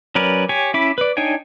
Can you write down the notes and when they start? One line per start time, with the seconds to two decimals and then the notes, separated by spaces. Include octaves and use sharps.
0.15 F#3 C#4 A#4 B4 D5
0.49 G4 C#5 G#5
0.74 C#4 E4 E5 B5 D6
0.98 B4 D5
1.17 D4 D#4 C#5 G5 G#5